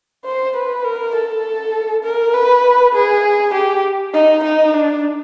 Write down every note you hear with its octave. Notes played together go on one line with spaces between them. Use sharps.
C5
B4
A#4
A4
A#4
B4
G#4
G4
D#4
D#4
D4